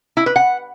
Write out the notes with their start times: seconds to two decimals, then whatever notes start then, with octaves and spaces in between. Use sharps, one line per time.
0.17 E4
0.26 B4
0.36 F#5